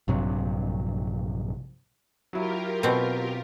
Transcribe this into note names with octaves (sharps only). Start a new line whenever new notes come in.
A#1 G2 C3 F#3
F#3 E4 F4 G4 A#4
B2 C4